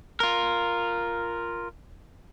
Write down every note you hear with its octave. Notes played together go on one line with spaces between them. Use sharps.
F4 A#4